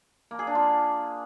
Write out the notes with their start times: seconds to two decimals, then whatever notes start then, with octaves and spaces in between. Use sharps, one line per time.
0.31 A#3
0.39 G#4
0.47 D4
0.55 F4